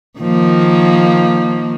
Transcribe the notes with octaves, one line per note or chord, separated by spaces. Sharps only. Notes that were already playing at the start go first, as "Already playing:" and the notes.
D#3 F3 A#3